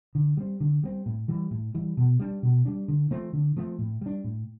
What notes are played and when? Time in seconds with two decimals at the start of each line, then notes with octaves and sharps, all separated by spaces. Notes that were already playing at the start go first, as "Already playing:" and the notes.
0.15 D3
0.37 G3 C4
0.60 D3
0.83 G3 C4
1.06 A2
1.28 E3 G3
1.51 A2
1.75 E3 G3
1.97 B2
2.20 G3 D4
2.43 B2
2.65 G3 D4
2.88 D3
3.11 F3 A3 C4
3.33 D3
3.57 F3 A3 C4
3.79 A2
4.01 G3 D4
4.24 A2